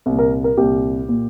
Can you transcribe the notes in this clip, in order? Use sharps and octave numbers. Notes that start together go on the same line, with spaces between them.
C2 A#2
A#4
A#4
C2 A#2 G4
A#2